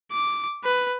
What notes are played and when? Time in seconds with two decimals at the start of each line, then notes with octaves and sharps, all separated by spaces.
0.11 D6
0.64 B4